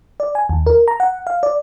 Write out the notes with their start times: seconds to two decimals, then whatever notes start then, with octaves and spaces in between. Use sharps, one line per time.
0.20 D5
0.35 G#5
0.49 D#2
0.67 A#4
0.88 A#5
1.00 F#5
1.27 F5
1.43 D5